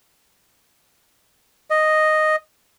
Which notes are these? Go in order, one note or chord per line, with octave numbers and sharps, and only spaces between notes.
D#5